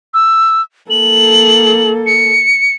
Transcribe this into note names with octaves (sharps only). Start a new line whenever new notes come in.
E6
A#3 A4 F#7
C#7